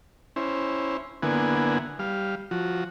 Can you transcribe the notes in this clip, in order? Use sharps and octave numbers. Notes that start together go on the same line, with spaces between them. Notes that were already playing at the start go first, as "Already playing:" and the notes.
C#4 E4 C5
D3 A#3 B3 E4 F#5 G#5
G3 F5
F3 F#4